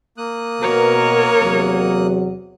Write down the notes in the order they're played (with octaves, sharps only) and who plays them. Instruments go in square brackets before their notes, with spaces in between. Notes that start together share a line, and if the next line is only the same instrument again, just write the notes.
[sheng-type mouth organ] A#3 D#6 F#6
[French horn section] B2 [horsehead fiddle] A#4 C#5
[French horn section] E2 C3 F#3